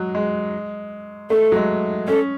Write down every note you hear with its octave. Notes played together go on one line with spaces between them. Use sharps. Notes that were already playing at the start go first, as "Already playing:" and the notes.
Already playing: F#3 G#3
G#3
A3 A4
F#3
G#3
C#4 A4